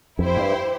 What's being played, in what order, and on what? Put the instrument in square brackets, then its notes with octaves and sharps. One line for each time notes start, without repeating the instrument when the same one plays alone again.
[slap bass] F2 [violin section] E4 G4 C5
[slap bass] G2